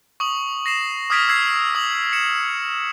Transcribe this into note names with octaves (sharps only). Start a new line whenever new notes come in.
C#6 D#6 F#7
A#6 C7 E7
D6 D#6 F6 G#6 B6 D7
D6 E6 G#6 C7
D#6 F#7
C#7 E7